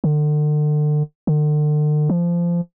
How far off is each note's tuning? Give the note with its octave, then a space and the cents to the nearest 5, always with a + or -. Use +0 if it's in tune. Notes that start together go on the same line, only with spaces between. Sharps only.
D3 +35
D3 +40
F3 -20